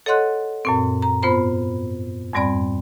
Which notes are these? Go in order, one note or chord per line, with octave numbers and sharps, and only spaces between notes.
A4 C#5 D#5 F#5 C6 F#6
F#2 A#2 C4
A#5
G#2 B3 F4 C5 B5
F2 G#2 G3 C4 D5 B5